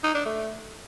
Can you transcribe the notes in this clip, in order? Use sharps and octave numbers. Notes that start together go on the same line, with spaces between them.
D#4
D4
A3